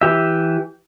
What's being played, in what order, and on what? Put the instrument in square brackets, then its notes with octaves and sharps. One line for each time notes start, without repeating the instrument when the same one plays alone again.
[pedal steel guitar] E3 G4 E5